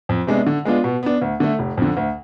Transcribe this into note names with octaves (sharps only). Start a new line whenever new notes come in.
F2
C3 G#3 B3 D4
D3
G#3 B3 D4 F4
B2
B3 D4
D2
D3 A3
F1
F2 D3
D2